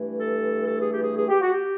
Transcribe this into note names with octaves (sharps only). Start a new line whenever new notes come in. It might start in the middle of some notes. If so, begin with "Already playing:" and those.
Already playing: G2 E3 A3
A4
A4
G#4
G4
G#4
G#4
G4
F#4
G4